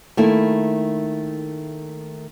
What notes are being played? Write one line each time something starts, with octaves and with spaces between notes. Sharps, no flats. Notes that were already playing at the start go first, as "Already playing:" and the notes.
D#3 A3 A#3 E4